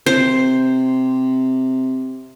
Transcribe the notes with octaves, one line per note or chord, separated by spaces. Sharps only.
C3 C5